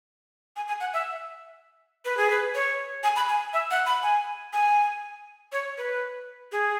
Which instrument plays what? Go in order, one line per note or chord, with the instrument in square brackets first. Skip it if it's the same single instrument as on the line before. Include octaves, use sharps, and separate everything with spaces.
[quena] G#5
G#5
F#5
E5
B4
G#4
B4
C#5
G#5
B5
G#5
E5
F#5
B5
G#5
G#5
C#5
B4
G#4